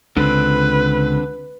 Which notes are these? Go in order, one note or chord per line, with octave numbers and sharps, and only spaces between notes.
C#2 D3 C4 B4